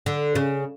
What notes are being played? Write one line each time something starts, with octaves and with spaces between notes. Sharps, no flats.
D3
C#3